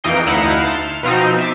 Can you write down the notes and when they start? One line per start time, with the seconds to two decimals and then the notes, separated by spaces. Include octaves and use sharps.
0.04 F2 E3 A#3 D#4 G5 C7
0.26 D2 D#4 E4 F5 F#5 E7
0.65 A5 C6
0.78 F6
1.03 B2 F3 C4 D#4
1.38 E5 D6